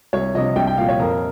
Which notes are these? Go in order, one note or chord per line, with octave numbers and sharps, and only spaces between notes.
C2 C#5
C3 F3 D#5
C2 G5
G5
A#2 F3 F5
C#5
F2 A#4